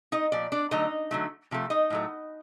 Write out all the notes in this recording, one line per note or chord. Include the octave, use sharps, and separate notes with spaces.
D#4 D#5
A#2 F3 D5
D4 D5
D3 F#3 A3 D#4 D#5
D3 F#3 A3
C3 F3 A3
D#4 D#5
A2 F#3 A3